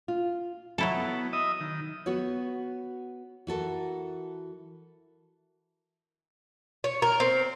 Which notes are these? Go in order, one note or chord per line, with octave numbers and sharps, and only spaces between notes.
F4
F#3 E4 A4
B3
D#5 E5 D#6
D#3
B3 F#4 C#5
E3 F#4 A4 A#4
C#5
A#4
C4